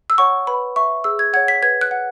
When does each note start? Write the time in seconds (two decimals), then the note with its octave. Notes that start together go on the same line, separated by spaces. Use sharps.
0.10 E6
0.18 C#5 F#5 C#6
0.47 B4 B5
0.76 E5 C#6
1.04 G#4 E6
1.19 G#6
1.33 C#5 F#5 G#6
1.48 B6
1.62 B4 G#6
1.81 F#6
1.91 F#5